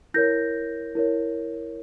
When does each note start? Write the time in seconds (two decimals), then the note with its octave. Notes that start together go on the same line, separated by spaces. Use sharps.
0.14 E4 A#4 C#5 G6 A#6
0.95 E4 A#4 C#5